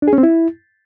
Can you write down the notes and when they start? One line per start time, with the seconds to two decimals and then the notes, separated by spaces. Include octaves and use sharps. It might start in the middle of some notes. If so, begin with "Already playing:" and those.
0.02 D4
0.08 G#4
0.13 C#4
0.18 C4
0.23 E4